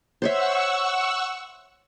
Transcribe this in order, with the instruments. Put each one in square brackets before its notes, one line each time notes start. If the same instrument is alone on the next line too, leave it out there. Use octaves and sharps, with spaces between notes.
[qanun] C5 C#5 E5 [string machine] F#5 C#6 E6